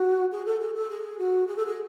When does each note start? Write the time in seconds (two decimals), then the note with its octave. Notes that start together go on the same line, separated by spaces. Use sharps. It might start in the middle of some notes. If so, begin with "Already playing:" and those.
Already playing: F#4
0.32 G#4
0.46 A4
0.60 G#4
0.74 A4
0.90 G#4
1.19 F#4
1.47 G#4
1.56 A4
1.66 G#4